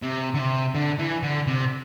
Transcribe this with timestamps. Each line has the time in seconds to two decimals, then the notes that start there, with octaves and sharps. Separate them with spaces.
0.03 C3
0.34 D3
0.39 C3
0.75 D3
0.99 E3
1.23 D3
1.47 C3